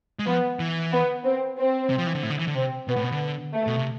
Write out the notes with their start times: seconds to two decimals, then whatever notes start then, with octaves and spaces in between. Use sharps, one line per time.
0.19 G#3
0.27 F3 B3
0.59 E3
0.92 B3
1.25 C4
1.58 C4
1.90 C3
1.98 F3
2.07 E3
2.15 D3
2.23 A2
2.30 D3
2.39 E3
2.47 D3
2.55 C3 C4
2.88 B2 B3
2.96 A2
3.04 B2
3.12 D3
3.54 A3
3.67 B2
3.76 C3